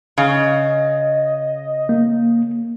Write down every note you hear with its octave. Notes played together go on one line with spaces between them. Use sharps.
C#3 D#5
A#3